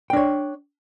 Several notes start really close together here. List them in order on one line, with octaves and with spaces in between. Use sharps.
G5 D4 C#5